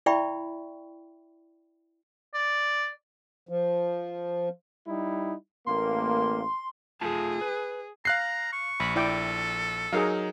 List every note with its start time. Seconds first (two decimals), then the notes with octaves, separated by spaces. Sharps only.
0.06 E4 D5 E5 G5 B5 C#6
2.34 D5
3.49 F3
4.87 G3 D#4 E4
5.66 A1 A#3 C6
7.01 A3 F4 G#4 A5
7.41 B4
8.05 F5 A#5 F#6 C7
8.52 C#6
8.80 A#1 B5
8.96 E4 A4 D5 G5
9.93 F#3 D#4 G#4 A#4 F5